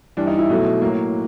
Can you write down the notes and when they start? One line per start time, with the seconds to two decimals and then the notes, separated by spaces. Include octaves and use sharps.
0.17 G2 E3 G3 D4
0.27 D#4
0.38 E4
0.49 B2 F#3 A3
0.82 A2 F#3 A#3